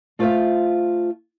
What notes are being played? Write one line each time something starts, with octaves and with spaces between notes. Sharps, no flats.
A3 F4 C5 D5 E5 F5